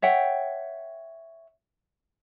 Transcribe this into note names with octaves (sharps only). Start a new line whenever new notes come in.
C#5 E5 F#5 G5